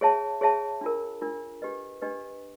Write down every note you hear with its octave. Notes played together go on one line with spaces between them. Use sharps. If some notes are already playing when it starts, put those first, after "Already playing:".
G#4 C#5 E5 A5
G#4 C#5 E5 A5
D4 F4 A#4
D4 F4 A#4
D4 G4 B4 D#5
D4 G4 B4 D#5